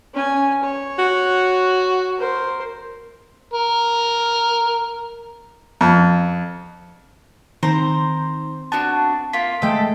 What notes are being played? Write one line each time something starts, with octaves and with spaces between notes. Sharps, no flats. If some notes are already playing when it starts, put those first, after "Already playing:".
C#4 G#5
C#5
F#4
A#4 C5
A#4
F2
D#3 C4 C5 A#5
B3 D4 F#4 A5
A#3 F4 B6
G#3 A3 A4 G5